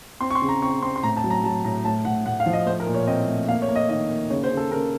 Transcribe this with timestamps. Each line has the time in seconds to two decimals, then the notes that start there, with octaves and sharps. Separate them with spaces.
0.21 C4 C6
0.30 C#6
0.35 C6
0.42 C#3
0.49 A#5
0.62 C4 C#6
0.82 C4 C6
0.96 C6
1.03 A2 A#5
1.17 A5
1.24 F#3
1.30 A#5
1.43 F#3 A5
1.64 A2 A#5
1.85 A2 A5
2.05 A2 F#5
2.25 A2 F#5
2.40 F5
2.46 F3
2.53 D#5
2.66 A3 C5
2.80 A#4
2.87 A#2
2.94 C#5
3.07 C4 D#5
3.28 A3
3.48 A#3 F5
3.62 C#5
3.69 A#3
3.75 D#5
3.89 D#3 D#5
4.10 A#3
4.30 C#3 C#5
4.44 C5
4.51 C#3
4.57 A4
4.71 C#3 A#4